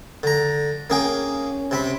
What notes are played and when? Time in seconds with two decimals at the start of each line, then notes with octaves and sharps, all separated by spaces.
0.23 D3 A#5
0.90 A#3 C#4 G#4 G5
1.71 C3 C4 B5